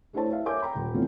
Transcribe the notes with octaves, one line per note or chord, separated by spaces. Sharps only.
A3 D4 E4 C5 C#5 A5
E4 B4 E5 F5
A#4 C#5 E5 G#5 D6 G6
G5 A#5 B5
D#1
C3 E3 A3 B3 C#4 F4